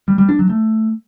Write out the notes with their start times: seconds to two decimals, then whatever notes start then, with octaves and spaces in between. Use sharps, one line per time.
0.08 G3
0.18 G3
0.29 D4
0.39 F#3
0.49 A3